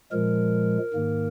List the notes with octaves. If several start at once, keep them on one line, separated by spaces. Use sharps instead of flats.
A#2 F3 G#3 A#4
G#2 D#3 A#3